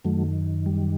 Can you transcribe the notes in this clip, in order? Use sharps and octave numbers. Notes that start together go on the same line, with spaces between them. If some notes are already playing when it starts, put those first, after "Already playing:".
F#2 D#3 F#3 A3
G3